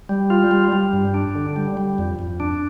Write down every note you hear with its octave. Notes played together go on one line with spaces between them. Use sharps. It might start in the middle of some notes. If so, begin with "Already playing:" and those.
G3
F4
G3
G3
G2
D4
D3
G3
G3
F2
F2
D4